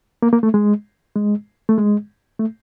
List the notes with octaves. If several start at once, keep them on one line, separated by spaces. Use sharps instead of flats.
A#3
A#3
A3
G#3
G#3
A3
G#3
A3